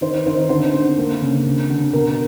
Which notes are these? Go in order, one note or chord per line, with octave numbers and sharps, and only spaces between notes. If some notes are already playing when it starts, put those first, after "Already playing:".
D#3 C5
D#3 C5
D3 C5
D3
A#3
C#3
D3
D3
B2 A#4